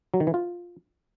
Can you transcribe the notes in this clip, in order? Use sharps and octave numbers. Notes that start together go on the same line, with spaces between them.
F#3
D#3
E3
F4